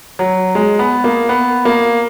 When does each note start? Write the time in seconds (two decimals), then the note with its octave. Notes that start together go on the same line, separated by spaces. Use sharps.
0.19 F#3
0.55 G#3
0.79 B3
1.04 A#3
1.29 B3
1.65 A#3